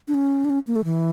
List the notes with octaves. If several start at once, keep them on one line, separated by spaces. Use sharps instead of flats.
D4
C#4
D4
C#4
A#3
A3
E3